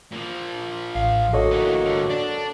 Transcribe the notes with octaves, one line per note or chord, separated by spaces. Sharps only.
A#2 F3
A1 F5
D2 A#3 F#4 A4 C#5 D#5
E3 D#4
G2 D3
D4 D5